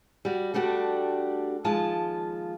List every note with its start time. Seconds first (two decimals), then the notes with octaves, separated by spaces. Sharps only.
0.25 G3 F#4
0.54 G3 A3 D4 F#4 G4
1.64 D#2 F3 G#3 F4 A5